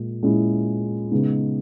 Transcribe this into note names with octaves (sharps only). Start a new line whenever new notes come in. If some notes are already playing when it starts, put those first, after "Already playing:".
Already playing: A#2 G#3
A#2 G#3 C#4 E4
C#3 G#3 B3 D#4